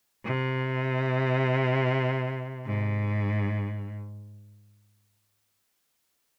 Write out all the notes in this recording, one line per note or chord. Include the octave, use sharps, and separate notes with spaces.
C3
G#2